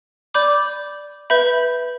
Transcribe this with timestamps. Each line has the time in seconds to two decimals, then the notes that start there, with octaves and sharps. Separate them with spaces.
0.34 D5 B5 D6 G6
1.30 B4 E5 B5 G6